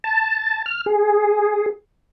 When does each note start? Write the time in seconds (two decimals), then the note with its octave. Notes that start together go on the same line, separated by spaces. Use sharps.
0.04 A5
0.66 F6
0.86 G#4